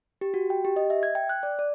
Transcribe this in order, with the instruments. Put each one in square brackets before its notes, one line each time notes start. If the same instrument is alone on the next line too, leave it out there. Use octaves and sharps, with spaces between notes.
[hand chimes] G4
F#4
G5
G4
D#5
E5
G#6
G5
F#6
D5
D5